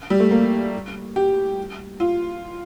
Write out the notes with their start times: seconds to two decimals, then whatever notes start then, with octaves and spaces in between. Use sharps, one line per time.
0.10 G3
0.20 A3
0.31 A#3
1.16 G4
2.00 F4